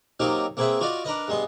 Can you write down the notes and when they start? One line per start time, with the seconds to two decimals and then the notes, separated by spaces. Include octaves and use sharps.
0.20 F#3 A#3 C4 D#4 F4 G4
0.57 A#3 C4 G#4 B4 C5 E5
0.81 F4 F#4 D5 D#5
1.05 D4 A#4 B4 D#5
1.28 G2 G#3 B3 C6